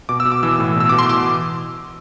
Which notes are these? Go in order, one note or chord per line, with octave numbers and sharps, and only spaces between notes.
B2 D6
E6
B2
D6
E3 E6
A2
B2 E6
B2 D6
C6
E3 D6